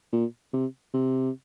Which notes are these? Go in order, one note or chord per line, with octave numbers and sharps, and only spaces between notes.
A#2
C3
C3